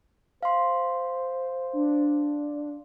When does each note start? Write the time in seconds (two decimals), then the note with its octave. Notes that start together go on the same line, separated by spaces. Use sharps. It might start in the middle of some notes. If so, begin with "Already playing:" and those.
0.43 C5 F5 C6
1.73 D4